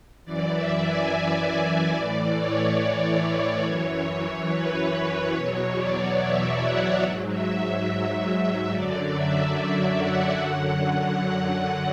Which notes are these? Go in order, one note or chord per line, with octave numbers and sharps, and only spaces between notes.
F#2 E3 D5
E5
G#5
G#5
E5
A2 E3 D5
C#5
F#2 E3
B4
B4
E2 B2 F#3 C#5
D5
E5
F#5
G#2
F#3
E5
E5
F#2 D3 F#3 D5
E5
E5
F#5
F#2 D3 F#3
F#5